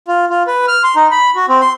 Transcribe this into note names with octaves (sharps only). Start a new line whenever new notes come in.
F4
F4
B4
F6
C6
D#4
B5
F#4
C4
C6